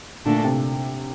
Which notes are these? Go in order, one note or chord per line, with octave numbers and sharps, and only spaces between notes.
A#2 D3 A3 D4 A4
C3